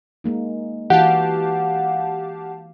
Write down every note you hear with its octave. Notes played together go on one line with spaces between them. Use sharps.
G#3 A#3 D#4
E3 F#4 G4 F5 F#5 A5